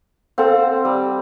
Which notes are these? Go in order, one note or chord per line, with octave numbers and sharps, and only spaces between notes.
C4 A4 F5 F#5
G3